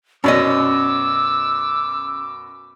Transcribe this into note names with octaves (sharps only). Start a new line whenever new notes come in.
F#2 B2 C#4 D5 D#5 D6 E6